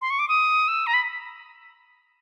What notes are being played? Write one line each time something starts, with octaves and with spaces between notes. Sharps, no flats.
C6
C#6
D6
D#6
E6
A#5
B5